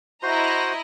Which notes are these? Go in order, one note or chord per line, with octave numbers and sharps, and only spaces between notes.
E4 F#4 C5 D#5 A#5 C6